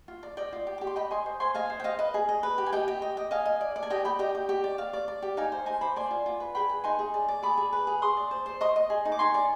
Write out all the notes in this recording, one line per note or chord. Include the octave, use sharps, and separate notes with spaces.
F4
D5
D5 D#5 G5
F4
G4
G4 D6
C6
D#5 G5 B5
D#5 G#5 C6
C5
C5 G#5 C6
D#5 F5 G#5
C5
G5
D#5 F5
B4 D#5
G#4
D#5
B4
G4
G#5
G4 D#5 G5
G4
D#5
D#5
D#5 F5 G#5
D#5
D5
D5
G#5
G4 D#5 G5
D5 G5 B5
G4 D#5 G5
G4
G4
D5
D5 F5
D5
D5
G4
D#4 F5 G#5
C5
D#4 G#5 C6
C5 B5 D6
D5 G#5 C6
F4
F4
B4
G#4 G5 B5
B4
D#4 G#5 C6
G#4
D5
D5
G#4 B5 D6
G#4
B4
G#4
G#4 C6 D#6
D5
C5
C5
D#5 C6 D#6
D#5
G#4
D#4
D6
D#4 G#5 C6
D5